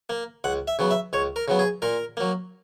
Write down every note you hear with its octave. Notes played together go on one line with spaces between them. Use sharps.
A#3
C#2 F#5
E5
C#3 F#3 B3
E5
C#2 C#5
A#4
C#3 F#3 B3
G#4
A#2 A#4
F#3 A#3